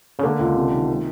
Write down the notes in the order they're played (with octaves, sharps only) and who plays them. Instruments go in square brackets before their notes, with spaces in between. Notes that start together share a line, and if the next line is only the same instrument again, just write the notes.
[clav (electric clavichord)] C#3
[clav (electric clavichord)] D3 [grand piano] A#3
[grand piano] C#2
C3
D#3
A#3